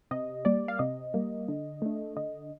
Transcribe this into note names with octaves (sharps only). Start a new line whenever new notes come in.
C3 D#5
G3 A#3 D5
F5
C3 D#5
G3 A#3
D3
A3 D4
D3 D#5